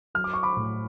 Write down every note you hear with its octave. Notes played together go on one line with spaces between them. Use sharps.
F#3 F6
D6
C#6
B5 D6
A2